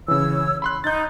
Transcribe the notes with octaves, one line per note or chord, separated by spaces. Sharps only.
C#3 E3 C#5 E6
B5 C6 F#6
D#4 G6 A6